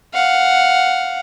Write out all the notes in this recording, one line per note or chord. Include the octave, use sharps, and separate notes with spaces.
F5 F#5